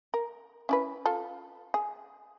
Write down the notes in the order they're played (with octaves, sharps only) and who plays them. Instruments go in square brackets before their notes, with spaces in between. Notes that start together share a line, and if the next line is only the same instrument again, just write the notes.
[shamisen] A#4
C#4 E4 B4
F4 A4
G#4